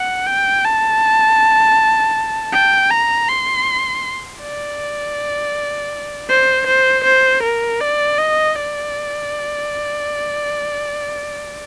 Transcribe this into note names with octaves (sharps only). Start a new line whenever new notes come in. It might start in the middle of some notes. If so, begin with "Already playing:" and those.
Already playing: F#5
G5
A5
G5
A#5
C6
D5
C5
C5
C5
A#4
D5
D#5
D5